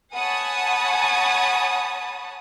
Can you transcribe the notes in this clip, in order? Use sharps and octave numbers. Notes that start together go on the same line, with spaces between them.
C#5 F#5 G#5 A5 B5 D#6